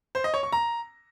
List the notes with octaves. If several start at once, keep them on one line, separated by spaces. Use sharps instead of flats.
C5
D#5
C#5
C#6
A#5